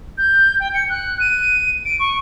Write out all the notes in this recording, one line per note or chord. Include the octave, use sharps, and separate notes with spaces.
G6
G5
C#7
F#6
D#7
D7
C#6